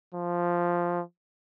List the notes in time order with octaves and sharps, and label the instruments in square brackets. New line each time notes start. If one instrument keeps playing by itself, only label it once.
[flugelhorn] F3